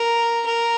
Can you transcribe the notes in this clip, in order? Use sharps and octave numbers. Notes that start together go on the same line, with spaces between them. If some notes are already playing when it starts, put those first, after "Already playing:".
Already playing: A#4
A#4